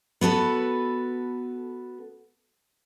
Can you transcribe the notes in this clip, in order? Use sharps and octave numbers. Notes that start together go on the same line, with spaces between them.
B3 F#4 A4 B4